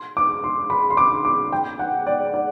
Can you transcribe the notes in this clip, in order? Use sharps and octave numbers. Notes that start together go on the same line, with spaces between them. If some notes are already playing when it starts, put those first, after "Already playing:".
Already playing: C6
D6
C6
B5
C6
D6
D6
G5
F#5
D5
D5